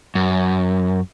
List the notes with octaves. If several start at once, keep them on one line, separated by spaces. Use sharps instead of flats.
F#2